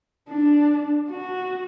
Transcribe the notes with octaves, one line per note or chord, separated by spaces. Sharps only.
D4
F#4